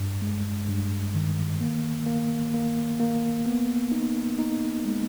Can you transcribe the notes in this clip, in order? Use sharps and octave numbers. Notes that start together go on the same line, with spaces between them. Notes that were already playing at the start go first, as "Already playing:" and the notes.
Already playing: G2
G#3
G2
D#3
A#3
A#3
A#3
A#3
B3
D#4
D#4
G#3